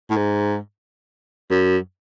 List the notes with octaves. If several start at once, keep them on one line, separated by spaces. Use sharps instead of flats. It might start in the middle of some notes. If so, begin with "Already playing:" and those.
A2
G#2
F#2